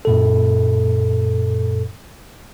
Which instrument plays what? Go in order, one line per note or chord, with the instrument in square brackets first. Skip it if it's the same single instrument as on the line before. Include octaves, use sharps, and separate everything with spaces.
[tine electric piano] F#2 A#2 A4